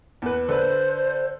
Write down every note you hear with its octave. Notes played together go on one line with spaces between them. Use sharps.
E2 B4
D3 B4 C5